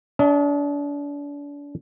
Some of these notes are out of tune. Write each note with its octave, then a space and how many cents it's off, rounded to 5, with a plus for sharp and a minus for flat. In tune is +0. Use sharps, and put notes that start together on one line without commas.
D4 -35 D#5 +30 A5 +30